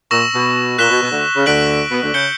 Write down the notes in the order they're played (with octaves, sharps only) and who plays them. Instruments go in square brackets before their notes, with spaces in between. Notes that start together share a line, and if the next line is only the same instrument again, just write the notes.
[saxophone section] A#2 [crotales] C#6 E6 A#6 E7
[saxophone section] B2
[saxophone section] A#2 [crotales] F#6 B6 E7 G7
[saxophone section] B2
B2
D2 D3
C#3
[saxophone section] D2 D3 [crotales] F#6 B6 D7 F#7
[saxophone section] B2 B3
D2 D3
[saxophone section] C#3 [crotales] G6 C#7 G7